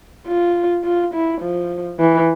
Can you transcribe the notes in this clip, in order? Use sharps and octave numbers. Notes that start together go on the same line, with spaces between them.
F4
F4
E4
F3
E3